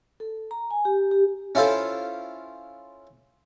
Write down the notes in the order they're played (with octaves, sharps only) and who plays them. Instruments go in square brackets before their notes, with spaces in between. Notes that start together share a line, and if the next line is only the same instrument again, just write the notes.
[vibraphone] A4
A#5
G#5
G4
G4
[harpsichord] C#4 E4 F4 A4 C5